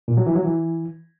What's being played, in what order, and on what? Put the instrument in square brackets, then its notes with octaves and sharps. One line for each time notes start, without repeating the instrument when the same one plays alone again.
[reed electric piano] A#2
F#3
E3
F#3
E3